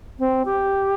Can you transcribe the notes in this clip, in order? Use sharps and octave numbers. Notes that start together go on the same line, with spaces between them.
C4
G4